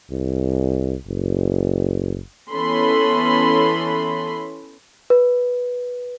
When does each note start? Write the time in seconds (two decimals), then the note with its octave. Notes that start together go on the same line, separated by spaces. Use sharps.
0.11 C2
1.07 F#1
2.53 E3 B3 C#4 A4 B5 C6
5.10 B4